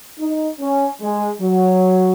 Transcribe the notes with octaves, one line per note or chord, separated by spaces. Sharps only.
D#4
C#4
G#3
F#3